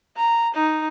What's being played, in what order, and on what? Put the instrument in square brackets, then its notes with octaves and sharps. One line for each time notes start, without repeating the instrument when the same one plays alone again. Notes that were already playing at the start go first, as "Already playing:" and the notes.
[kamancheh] A#5
D#4